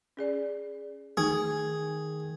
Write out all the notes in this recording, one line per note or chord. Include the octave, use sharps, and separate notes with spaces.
C#4 G#4 D5
D#3 A3 D#4 G#4